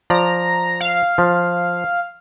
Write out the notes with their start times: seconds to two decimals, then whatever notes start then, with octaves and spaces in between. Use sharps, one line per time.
0.10 F3 D5 A#5
0.81 F5
1.18 F3